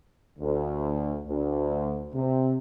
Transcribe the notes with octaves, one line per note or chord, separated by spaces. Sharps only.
D2
D2
C3